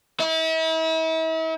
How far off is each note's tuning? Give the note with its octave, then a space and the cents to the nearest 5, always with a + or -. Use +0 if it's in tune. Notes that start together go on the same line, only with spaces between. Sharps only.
E4 -40